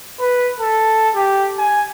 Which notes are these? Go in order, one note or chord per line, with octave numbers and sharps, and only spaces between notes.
B4
A4
G4
G#5